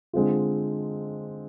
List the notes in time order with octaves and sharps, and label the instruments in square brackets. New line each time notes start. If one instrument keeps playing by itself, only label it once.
[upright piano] D3 G#3 C4 F4